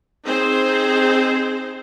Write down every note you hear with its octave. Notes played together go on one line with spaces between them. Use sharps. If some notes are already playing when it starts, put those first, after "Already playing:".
C4 D#4 G#4 C5